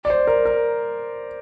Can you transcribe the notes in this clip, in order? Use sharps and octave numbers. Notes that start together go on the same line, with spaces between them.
D5
C5
A#4
A#4